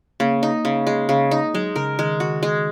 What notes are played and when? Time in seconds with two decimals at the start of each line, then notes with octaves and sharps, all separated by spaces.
0.20 C#3 A#3
0.43 D#4
0.65 C#3
0.87 G#3
1.09 C#3
1.31 D#4
1.54 F#3 G#3
1.76 C#3 A#4
1.99 D#3 G#3
2.20 D#3 F#4
2.43 G#3